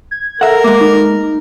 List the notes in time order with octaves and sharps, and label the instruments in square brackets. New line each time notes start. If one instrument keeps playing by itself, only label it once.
[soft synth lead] G#6
[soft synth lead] A4 [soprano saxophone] A#4 [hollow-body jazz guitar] E5 F#5
[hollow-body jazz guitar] G#3 A#3 [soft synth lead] D6
[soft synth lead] D#4